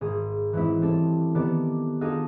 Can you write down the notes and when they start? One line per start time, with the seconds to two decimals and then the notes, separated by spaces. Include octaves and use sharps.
0.01 G#1 G#4 C6
0.53 E3 F#3 G#3 C4 E4
0.81 G3 C4 A4 C#5
1.35 D#3 B3 G4 A4 D5
2.01 D4 D#4 F4 F#4 G#4 A4